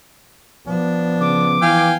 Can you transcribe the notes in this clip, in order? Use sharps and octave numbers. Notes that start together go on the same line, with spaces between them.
F3 B3 D4
C#3 D6
E3 F5 G5 G#5